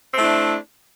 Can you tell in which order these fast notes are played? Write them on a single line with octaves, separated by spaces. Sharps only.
C4 A3 E4 D4